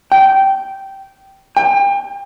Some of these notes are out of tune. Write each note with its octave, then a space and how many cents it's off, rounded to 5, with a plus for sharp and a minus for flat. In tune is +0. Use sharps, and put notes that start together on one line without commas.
G5 -10
G5 +35